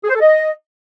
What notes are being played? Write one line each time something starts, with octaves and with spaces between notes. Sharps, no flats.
G#4
C5
A4
D#5